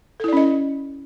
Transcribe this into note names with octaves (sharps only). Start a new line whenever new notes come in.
C#4 E4 A4 D5 D#5